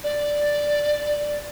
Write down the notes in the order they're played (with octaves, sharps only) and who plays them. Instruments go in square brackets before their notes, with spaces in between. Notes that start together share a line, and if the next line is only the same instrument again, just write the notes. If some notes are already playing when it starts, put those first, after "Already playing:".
[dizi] D5